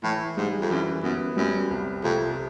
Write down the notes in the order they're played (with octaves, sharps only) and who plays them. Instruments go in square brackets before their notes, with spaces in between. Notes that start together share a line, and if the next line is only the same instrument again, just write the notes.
[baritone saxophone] A2 [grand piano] E3
[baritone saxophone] G#2 [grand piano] G3
[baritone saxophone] F2
[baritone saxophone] F#2 [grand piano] E3
[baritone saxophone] F#2 [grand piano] B3
[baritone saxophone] F#2 [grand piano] G3
[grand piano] C2
[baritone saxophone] F2 [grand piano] C3